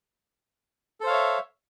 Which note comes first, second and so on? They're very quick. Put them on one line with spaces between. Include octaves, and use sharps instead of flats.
A4 C5 F5 C#5 E5